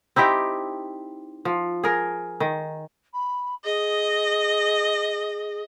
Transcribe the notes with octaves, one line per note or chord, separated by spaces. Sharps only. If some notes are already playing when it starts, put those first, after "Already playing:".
C4 D#4 E4 G4
F3
G#4 A#4
D#3
B5
G#4 D#5